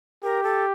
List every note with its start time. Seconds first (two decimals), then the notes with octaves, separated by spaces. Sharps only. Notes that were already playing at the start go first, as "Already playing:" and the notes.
0.23 G4 A#4
0.43 A4